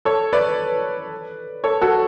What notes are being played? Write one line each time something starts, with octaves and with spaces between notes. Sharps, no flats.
A4 C#5
B4 D5
A4 C#5
F#4 A4